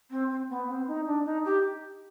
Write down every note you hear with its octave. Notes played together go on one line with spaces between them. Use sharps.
C4
C4
B3
C4
D#4
D4
D#4
G4